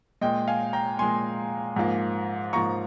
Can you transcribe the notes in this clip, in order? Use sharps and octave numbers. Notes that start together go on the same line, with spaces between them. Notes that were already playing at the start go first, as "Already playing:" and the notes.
A#2 G#3 D#5 G5
F5 G#5
G5 A#5
A#2 G#3 G#5 C6
G#2 F3 A#3
G#2 F3 A#3 A#5 C#6